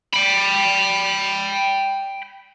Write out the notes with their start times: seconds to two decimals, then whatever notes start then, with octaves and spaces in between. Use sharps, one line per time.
0.14 G5 B5